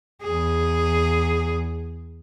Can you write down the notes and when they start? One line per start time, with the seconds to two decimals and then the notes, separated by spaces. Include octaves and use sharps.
0.22 E2 G#4